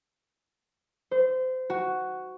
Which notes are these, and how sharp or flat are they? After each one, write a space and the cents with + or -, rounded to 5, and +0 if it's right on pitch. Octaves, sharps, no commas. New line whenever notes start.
C5 -25
F#4 +5